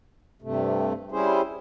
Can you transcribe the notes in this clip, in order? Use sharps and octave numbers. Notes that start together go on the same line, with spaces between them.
G2 C3 A3
G3 C#4 E4 G#4 C5